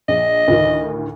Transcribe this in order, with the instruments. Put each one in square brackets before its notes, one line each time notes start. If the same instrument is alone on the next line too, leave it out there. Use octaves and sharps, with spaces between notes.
[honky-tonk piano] A#1 [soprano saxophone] D#5
[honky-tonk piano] D2 A2 D#3